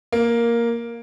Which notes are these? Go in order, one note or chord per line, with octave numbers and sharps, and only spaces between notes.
A#3